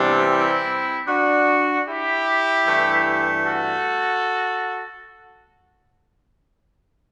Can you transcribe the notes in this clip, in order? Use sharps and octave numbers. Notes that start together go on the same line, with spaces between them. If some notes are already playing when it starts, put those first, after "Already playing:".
Already playing: C3 E3 G3 B3 D4
C4 E4
D4 F#4
E4 G4
G2 E3 A3
F#4 A4